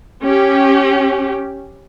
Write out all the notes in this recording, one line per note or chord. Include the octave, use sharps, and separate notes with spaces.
C#4 G4